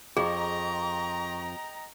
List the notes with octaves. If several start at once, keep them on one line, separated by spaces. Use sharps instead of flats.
F2 G#4 D#5 G5 A#5 C#6